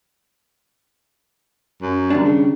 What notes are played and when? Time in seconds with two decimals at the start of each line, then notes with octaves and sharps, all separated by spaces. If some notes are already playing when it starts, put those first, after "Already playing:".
1.82 F#2
2.10 D#3 G3 D4
2.24 C#3